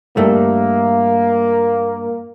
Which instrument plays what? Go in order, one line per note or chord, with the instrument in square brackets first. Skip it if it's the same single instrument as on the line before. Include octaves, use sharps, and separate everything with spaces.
[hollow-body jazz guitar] G2 A3 [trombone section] A#3